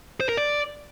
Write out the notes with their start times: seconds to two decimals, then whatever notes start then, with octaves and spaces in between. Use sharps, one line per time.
0.20 C5
0.29 A#4
0.37 D5